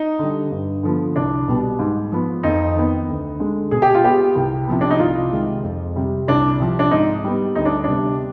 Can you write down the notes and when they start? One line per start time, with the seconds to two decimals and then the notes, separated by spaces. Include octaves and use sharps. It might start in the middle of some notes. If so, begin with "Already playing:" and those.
Already playing: D#4
0.19 D3 G3
0.51 G2
0.83 D3 F3 B3
1.16 C2 D4
1.48 B2 G3 B3
1.79 G#2
2.12 F3 B3
2.43 F2 D#4
2.76 D#3 B3
3.08 D2
3.39 D3 G#3
3.71 B2 G#4
3.82 G4
3.94 F4
4.04 B3 G4
4.36 C2
4.67 C3 F3 B3
4.81 D4
4.91 D#4
4.99 C2 F4
5.32 C3 D#3 G#3
5.63 F2
5.96 C3 G3
6.28 C2 D4
6.60 C3 F3
6.79 D4
6.91 G#2 D#4
7.24 G3 B3
7.55 D2 D#4
7.65 D4
7.84 C3 G3 B3 D4